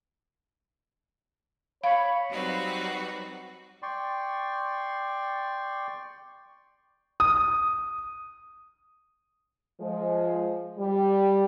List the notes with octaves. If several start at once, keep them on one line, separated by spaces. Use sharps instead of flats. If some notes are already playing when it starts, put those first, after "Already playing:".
C#5 F5 B5
F#3 G3 C4 D#4 F#4 B4
D5 G5 C6 C#6
D#6
F3 G#3
G3